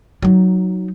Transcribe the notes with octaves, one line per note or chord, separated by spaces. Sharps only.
F#3 D#4